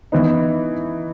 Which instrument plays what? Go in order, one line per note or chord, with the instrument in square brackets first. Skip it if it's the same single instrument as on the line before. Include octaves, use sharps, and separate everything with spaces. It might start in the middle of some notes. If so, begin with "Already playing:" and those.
[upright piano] E3 B3 D#4